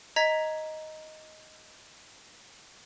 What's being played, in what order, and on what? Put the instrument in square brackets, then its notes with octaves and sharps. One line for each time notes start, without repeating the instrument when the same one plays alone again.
[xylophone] D#5 A#5 G#6 B6